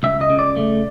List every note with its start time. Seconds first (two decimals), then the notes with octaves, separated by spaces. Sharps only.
0.03 C#2 E5
0.21 D#5
0.30 C#3
0.39 D5
0.56 A3